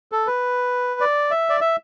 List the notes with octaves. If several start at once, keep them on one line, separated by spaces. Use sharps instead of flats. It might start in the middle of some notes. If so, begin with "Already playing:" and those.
A4
B4
D5
E5
D5
E5